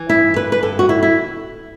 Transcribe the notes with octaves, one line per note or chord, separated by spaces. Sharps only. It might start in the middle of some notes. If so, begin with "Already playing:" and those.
Already playing: E3
G2 E4
D3 B4
B4
G2 A4
F#4
D3 E4
E4